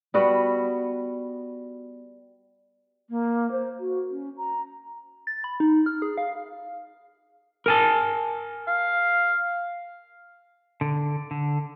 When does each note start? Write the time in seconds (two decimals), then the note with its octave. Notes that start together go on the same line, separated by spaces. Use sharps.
0.14 G3 B3 F#4
3.09 A#3
3.51 C5
3.79 F#4
4.10 C#4
4.37 A#5
5.27 A6
5.44 B5
5.60 D#4
5.86 F6
6.02 G#4
6.18 F5
7.66 A#4 G#5 A5
8.68 F5
10.81 D3
11.31 D3